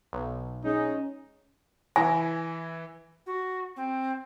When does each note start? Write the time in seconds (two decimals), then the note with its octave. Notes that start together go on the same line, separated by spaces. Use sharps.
0.13 B1
0.65 G#3 C#4 D#4
1.96 E3 E4 G#5 A#6
3.26 F#4
3.76 C4